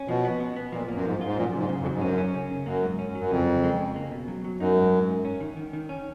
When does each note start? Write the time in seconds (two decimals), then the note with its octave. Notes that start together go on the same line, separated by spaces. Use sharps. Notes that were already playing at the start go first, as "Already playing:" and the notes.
Already playing: C#4
0.08 B2 F3
0.25 B3
0.40 B3
0.56 B3
0.72 A#2 F3
0.88 A#3
0.95 F#2
1.05 G#2 F3
1.21 G#2 F4
1.37 F#2 A#2
1.54 C#3
1.59 G#2
1.69 C#3
1.81 F2
1.86 F#3
1.93 G#2
2.01 F#2 C#4
2.18 C#4
2.34 C#3
2.50 C#3
2.66 F#2 A#3
2.83 G#2
2.99 C#4
3.15 F#2 F#3
3.31 F2 C#3
3.47 C#3
3.64 G#3
3.79 C#3
3.96 A#3
4.11 B2
4.28 F#3
4.44 F#3
4.60 F#2 D#4
4.76 G#2
4.92 G#2
5.09 G#2
5.25 C#4
5.40 D#3
5.57 D#3
5.73 D#3
5.89 C#4